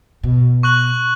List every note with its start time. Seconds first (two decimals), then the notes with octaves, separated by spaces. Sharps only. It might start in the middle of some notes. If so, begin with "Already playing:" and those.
0.23 B2
0.63 C#6 F#6 F#7